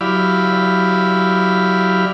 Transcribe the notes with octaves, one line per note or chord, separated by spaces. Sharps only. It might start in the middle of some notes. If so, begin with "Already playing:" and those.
F#3 E4 G4 D5 F5 B5